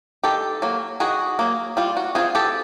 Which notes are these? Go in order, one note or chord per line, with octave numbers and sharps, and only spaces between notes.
D#3 G4 A4
F#3 A#3
D#3 F#4 G#4
F#3 A#3
G3 F4
F#4
C4 F4 F#4 G#4
G4 A4